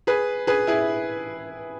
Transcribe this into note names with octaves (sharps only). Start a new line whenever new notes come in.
G#4 B4
G#4 B4
E4 G#4